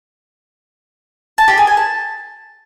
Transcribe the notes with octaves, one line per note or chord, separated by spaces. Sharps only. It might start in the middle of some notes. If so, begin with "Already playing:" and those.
A5
G4
G#4
G#5
A5